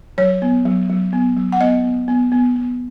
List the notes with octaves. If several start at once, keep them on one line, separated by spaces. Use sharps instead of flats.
F#3 C#5
B3
F#3
F#3
B3
F#3
F#5
B3 D#5
B3
B3
B3
B3